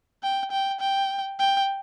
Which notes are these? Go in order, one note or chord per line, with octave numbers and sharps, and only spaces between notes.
G5
G5
G5
G5